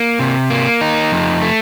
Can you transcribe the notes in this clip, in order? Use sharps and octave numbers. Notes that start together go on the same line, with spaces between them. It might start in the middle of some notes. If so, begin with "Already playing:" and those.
Already playing: A#3
C3
A#3
D#4
F2
A3